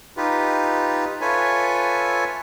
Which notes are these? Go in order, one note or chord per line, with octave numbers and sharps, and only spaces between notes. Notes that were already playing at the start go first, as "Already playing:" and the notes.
D#4 F4 G4 B4
F4 A4 B4 C#5 E5 G#5